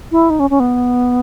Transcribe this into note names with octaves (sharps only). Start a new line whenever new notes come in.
E4
D#4
C#4
C#4
B3